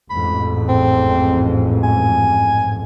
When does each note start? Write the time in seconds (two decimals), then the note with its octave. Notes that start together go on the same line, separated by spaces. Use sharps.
0.10 A1 F2 G#2 B5
0.69 C4
1.83 G#5